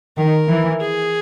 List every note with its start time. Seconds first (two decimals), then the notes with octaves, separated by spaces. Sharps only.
0.17 D#3 A#4
0.48 E3
0.80 G#4